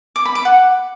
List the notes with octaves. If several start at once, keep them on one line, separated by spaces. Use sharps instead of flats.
D6
B5
D6
F#5